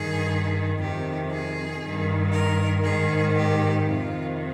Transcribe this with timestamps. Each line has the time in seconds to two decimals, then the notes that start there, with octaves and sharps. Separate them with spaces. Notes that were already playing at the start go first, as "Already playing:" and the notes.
Already playing: G2 D#3 G#4
0.79 F2 C3 D#3 G4
1.31 G#4
1.83 G2 D#3
2.33 A#4
2.85 G#2 D#3 G#4
3.37 G4
3.88 F2 C3 D#3 F4